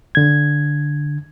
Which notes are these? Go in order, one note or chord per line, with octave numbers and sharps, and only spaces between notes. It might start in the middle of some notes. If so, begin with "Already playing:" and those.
D3 G#6